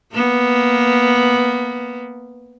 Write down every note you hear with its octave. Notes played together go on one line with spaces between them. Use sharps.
A#3 B3